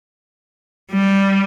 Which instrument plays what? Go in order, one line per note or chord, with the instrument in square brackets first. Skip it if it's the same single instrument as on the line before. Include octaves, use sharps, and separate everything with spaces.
[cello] G3